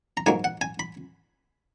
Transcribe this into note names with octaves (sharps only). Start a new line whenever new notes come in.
A#5
G#2 F#3 A#3 G#5
F#5
G#5
B5